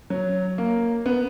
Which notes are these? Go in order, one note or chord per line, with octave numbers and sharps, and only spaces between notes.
F#3
A#3
B3